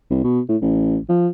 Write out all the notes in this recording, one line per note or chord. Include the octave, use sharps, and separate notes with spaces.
C2
B2
A2
A1
F3